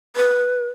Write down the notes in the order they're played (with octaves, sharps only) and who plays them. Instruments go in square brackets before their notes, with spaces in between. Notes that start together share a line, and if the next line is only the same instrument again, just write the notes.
[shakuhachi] B4